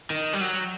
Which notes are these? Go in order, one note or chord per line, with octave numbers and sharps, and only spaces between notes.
D#3
G3
F#3